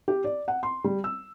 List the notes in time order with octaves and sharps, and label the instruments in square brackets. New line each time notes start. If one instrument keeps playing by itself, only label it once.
[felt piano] G4
D5
F#5
C6
G3
E6